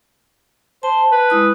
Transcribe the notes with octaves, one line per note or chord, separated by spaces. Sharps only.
C5 A5
B4
G#3 E4 D#6